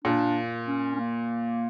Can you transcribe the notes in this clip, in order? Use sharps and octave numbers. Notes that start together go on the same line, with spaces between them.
A#2 D4
C#4
C#4
A#3